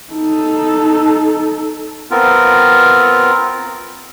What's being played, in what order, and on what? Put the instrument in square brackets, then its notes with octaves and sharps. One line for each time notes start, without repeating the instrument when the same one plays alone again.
[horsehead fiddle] D#4 A4
[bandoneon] B3 C4 F4 A#4